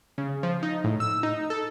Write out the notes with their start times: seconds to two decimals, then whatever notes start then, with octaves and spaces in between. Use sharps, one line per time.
0.18 C#3
0.43 F3
0.63 D#4
0.84 A2
1.00 E6
1.23 D#4
1.50 A4